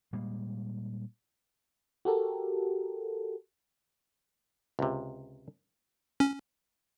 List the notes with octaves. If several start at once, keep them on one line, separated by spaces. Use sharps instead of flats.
A#2 G3 G#3 A#3
F#4 G4 A4 A#4
C#2 C3
C#4